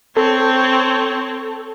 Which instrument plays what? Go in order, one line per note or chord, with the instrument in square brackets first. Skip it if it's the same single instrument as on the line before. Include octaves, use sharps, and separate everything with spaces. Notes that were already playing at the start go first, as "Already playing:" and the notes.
[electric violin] C4 C#5 [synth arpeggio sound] A4